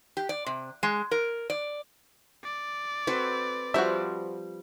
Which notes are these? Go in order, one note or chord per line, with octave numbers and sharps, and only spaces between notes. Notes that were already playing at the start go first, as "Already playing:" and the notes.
G4
D5
C3
G#3
A#4
D5
D5
C4 F#4 A4 B4
F3 G3 F#4 C5 E5